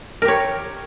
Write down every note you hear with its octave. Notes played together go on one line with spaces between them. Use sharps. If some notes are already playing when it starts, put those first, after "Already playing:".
G4 A#4 C#5